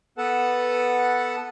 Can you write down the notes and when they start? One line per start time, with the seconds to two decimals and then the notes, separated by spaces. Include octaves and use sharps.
0.18 B3 A4 B4 F#5 A5